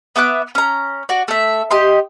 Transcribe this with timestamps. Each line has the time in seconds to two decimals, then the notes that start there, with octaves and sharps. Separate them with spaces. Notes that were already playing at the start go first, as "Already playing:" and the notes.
0.16 B3 E5 D6 F#6
0.55 C#4 A#5
1.09 F#4 D5
1.28 A3 E5
1.71 G4 D#5 C6